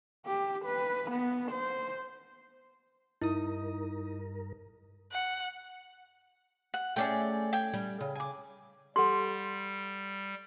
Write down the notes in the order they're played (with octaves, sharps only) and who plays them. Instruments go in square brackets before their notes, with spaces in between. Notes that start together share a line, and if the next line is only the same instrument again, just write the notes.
[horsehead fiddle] G4
B4
B3
C5
[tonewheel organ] G2 A#4 [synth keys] D#4 D#6 [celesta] E4
[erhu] F#5
[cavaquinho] F#5
[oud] A3 C#4 E5 [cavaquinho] G#4 D5 G5
[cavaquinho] G5 G#5
[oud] G3
C#3
[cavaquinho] G#5 D6
[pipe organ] G3 [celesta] G4 A4 F#5 [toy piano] C6